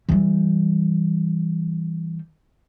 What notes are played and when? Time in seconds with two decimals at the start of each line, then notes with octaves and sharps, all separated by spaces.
0.09 E3 G3